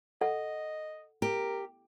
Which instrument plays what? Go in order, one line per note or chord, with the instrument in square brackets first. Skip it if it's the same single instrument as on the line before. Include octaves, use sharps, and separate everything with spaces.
[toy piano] A4 F#5 [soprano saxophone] D#5
[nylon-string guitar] G4 [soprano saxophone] A#4